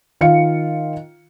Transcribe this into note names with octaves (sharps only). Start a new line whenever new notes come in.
D#3 F4 F5 C#7